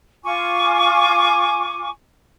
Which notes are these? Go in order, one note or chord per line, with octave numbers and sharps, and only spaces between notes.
F4 G#5 C#6 D6